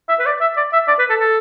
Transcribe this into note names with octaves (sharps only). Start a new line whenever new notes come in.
E5
B4
D5
E5
D5
E5
D5
B4
A4
A4